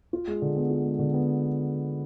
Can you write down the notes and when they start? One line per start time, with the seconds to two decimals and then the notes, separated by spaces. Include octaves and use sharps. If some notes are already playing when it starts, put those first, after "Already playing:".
0.13 F4
0.28 G#3
0.42 D3
0.56 B3
0.70 F4
0.85 G#3
0.99 D3
1.13 B3